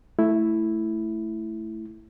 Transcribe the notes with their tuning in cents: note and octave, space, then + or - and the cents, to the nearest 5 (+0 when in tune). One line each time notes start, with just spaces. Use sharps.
A3 +0 E4 +0